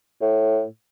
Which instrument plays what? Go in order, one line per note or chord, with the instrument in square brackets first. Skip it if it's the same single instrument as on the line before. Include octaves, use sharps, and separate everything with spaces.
[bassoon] A2